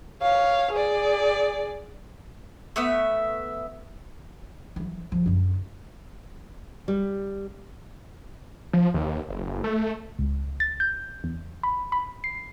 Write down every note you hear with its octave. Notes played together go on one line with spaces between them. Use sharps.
C#5 F5
G#4 D5
A3 B3 E5
E3 F#3
F3 C4
F#2 D3
G3
F3
D#2
F#1
A3
C#2
A6
G6
E2
B5
B5
C7